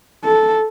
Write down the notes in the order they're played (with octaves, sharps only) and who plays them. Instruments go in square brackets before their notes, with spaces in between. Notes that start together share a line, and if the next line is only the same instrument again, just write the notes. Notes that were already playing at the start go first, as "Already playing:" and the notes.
[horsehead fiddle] A4